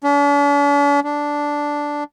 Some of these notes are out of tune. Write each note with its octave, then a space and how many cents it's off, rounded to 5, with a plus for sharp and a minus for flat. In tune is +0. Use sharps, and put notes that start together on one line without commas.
D4 -45
D4 -5